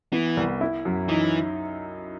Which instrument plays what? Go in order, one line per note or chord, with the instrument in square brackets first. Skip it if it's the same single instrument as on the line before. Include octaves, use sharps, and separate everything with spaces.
[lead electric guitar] E3 [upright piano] B3
[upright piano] C2
E4
F#2
[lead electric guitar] E3 [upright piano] D#4